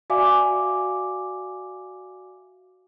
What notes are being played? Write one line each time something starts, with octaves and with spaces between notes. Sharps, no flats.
F#4 D5 E5 F5 G#5 D6